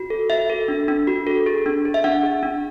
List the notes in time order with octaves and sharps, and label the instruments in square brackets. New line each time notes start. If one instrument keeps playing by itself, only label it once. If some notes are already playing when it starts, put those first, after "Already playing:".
Already playing: [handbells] F#4
A4
F#4 E5
A4
D4
D4
F#4
A4
G#4
D4
G#4
E5
D4 F#5
G#4
D4